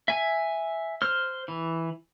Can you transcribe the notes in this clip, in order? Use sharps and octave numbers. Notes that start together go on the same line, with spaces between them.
E5 G#5
C5 F6
E3